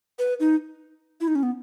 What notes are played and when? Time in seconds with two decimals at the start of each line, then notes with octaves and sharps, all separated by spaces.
0.19 B4
0.40 D#4
1.21 E4
1.28 D#4
1.35 C#4
1.43 B3